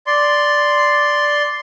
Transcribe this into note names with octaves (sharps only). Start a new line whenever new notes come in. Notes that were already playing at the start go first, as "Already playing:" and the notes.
D5 C6